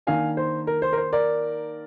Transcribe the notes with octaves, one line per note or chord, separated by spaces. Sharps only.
D#3 A#3 D4 F5 G#5
C5
A#4
C5
A#4
C5
A#4 D5